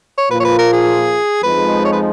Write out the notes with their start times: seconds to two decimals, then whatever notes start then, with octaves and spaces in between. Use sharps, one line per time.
0.18 C#5
0.30 A#2 F3 A#3 F4 B4
0.40 C#5
0.45 B4
0.59 A#4
0.73 G#4
1.43 F2 F3 G#3 D#4 B4
1.85 C#5
1.92 B4